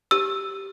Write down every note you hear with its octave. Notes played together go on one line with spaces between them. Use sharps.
G4 E6